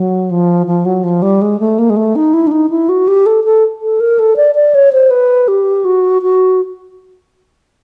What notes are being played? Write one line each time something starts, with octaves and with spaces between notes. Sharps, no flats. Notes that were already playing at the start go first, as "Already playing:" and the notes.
Already playing: F#3
F3
F3
F#3
F3
G3
G#3
A3
A#3
G#3
A3
D#4
E4
D4
D#4
E4
F#4
G4
A4
A4
A4
A#4
A4
D5
D5
C#5
C5
B4
G4
F#4
F#4